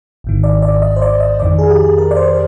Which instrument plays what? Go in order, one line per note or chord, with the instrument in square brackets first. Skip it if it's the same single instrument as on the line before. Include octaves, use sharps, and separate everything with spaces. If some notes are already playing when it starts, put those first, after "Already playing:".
[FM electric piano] G#1 G#2 D#3
D5
D5
D#5
C5
D5
D#5
F2 D#3 D5
G#4
G4
G#4
A#4
D5
C5
C5